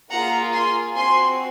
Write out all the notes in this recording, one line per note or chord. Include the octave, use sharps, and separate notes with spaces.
A#3 F4 G#4 F#5 A#5
G#5 C6
C4 F#4 G#5 C6